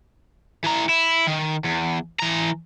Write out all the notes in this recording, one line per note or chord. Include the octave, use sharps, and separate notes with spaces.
E3 A#5
E4
D#3
E2
E3 A#5